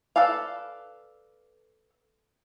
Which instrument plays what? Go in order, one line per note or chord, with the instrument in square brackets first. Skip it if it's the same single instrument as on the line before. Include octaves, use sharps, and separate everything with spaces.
[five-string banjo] A4 B4 D5 F5